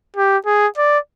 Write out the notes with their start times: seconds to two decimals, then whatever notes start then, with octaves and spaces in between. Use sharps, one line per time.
0.16 G4
0.46 G#4
0.77 D5